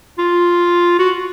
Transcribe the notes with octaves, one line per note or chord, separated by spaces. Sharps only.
F4
F#4